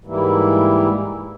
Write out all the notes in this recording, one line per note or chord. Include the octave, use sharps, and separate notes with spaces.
G#2 E3 G3 A#3 E4